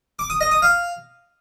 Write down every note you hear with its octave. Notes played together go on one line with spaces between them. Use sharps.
D6
D#6
D#5
D#6
F5